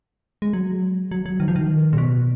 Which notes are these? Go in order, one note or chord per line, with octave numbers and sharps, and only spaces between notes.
G#3
F#3
F#3
F#3
D#3
F3
D#3
A#2
B2